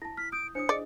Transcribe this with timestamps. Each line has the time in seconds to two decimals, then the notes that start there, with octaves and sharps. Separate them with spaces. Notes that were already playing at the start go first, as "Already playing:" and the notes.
0.02 E4 A5 A#6
0.17 F6 B6
0.32 D#6 G6 D7
0.55 D4 E4 C5 C#5 D#6 C#7
0.69 G#4 D5 D#5